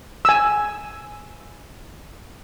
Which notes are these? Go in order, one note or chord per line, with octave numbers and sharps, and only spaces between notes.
G#5 E6